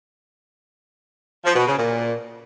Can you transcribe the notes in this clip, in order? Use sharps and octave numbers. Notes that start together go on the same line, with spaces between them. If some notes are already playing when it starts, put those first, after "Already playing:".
F3
B2
C#3
A#2